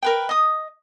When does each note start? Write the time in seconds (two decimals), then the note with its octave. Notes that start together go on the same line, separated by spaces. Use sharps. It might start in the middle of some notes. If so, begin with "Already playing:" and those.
0.02 A#4 B4 G5
0.29 D#5 D#6